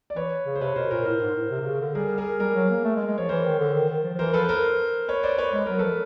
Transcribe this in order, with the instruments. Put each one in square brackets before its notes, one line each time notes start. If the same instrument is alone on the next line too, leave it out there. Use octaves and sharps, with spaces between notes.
[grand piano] D5
[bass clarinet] E3 [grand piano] B4 C#5
[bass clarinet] C#3
[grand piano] C5
[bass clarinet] C3 [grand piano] B4 C#5
[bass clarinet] B2 [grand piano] A#4 C5
[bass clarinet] A#2 [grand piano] A#4 C5
[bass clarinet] A2 [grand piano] A#4 C5
[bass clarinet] G#2
A2
C3
C3
C#3
D3
[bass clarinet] G3 [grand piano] G#4 A#4
[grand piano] G#4 A#4
[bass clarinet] G3 [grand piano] G#4 A#4
[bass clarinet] F#3
A#3
A3
G#3
G#3
[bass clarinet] F3 [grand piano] C#5
[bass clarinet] E3 [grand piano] A#4 C5
[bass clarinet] D#3
D3
D#3
D#3
F3
F3
[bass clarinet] E3 [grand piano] A#4 C5
[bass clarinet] F3 [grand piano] A4 B4
[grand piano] B4
A#4 C5
B4 C#5
C5 D5
B4 C#5
[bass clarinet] G#3 [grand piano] B4
[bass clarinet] F#3 [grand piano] A#4
[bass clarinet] F3 [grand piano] A4 B4